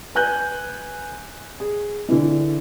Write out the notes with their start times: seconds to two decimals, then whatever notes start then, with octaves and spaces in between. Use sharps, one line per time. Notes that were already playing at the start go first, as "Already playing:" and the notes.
0.15 B4 G#5 F#6 G6
1.60 G#4
2.09 D3 E3